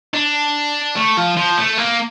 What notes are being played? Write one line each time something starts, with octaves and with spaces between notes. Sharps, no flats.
D4
A3
F3
F3
A3
A#3